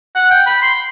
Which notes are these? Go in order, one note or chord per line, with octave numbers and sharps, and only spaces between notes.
F#5
G5
B5
C6